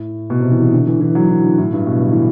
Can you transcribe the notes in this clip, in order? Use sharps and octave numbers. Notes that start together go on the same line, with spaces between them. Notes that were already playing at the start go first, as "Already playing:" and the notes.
Already playing: A2
B2
C3
E3
E3
D3
E3
E3
F#3
E3
D3
A2
G2
B2
D3
E3